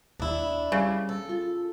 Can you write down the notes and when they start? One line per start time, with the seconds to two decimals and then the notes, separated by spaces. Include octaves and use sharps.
0.20 D#2 D4 E4
0.72 C#3 G3
1.09 A4
1.29 F4